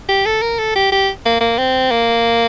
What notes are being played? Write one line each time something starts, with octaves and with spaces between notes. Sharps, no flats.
G4
A4
A#4
A4
G4
G4
A#3
A#3
C4
A#3